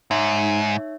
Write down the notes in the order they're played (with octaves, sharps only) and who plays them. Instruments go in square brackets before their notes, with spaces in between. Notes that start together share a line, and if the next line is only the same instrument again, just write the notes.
[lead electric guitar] G#2 [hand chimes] D#4 C#5 E5